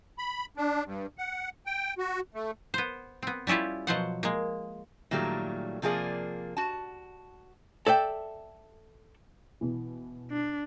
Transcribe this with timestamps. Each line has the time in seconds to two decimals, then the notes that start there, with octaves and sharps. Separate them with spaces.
0.18 B5
0.57 D4
0.85 G2
1.18 F#5
1.66 G5
1.98 F#4
2.34 A3
2.74 B3 C5
3.23 B3 C4
3.47 G3 C#4 E4 F4 G4
3.87 B2 F3 F#3 C5 F5 F#5
4.23 G#3 A#3
5.11 A#2 D#3 F#3 G3 A3
5.82 C3 F3 A#3 G#4 D5
6.57 F#4 A5
7.87 A4 D5 E5 G5
9.61 B2 E3
10.31 D4